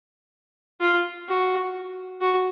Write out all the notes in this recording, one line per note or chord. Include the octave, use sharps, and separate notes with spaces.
F4
F#4
F#4